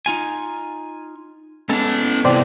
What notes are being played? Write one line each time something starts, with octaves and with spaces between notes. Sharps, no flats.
D#4 F4 G#5
G#3 B3 C#4 A4 A5
C3 E3 C5 D5 G5